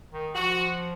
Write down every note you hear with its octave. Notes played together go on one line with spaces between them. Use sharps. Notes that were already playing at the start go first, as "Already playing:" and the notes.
D#3
F3 F#4